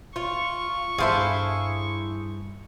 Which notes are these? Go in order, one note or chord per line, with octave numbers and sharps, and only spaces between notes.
F4 C#6
G2 D4 E4 G#4 A4 C5 F5